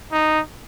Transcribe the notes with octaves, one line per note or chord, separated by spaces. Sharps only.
D#4